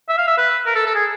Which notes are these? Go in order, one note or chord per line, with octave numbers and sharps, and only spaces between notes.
E5
F5
E5
B4
A#4
A4
A4
G#4